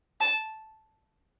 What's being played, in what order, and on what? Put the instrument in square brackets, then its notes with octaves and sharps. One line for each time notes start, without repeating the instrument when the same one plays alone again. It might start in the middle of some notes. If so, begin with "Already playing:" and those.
[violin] A5